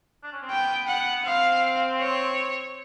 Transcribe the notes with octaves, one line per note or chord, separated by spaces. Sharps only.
D4
C#4
C4
B3 G5
F#5
C4 F5
C#5